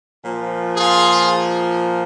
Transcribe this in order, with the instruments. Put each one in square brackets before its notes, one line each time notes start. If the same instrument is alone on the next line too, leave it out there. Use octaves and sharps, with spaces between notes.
[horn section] A#2 F3
F4 G#4